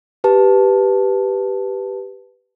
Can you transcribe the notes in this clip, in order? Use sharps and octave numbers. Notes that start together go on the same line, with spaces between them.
G4 B4 A5